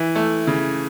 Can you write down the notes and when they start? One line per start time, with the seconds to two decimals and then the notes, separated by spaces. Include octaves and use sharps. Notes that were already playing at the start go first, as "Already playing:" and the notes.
Already playing: E3
0.15 A3
0.47 C#3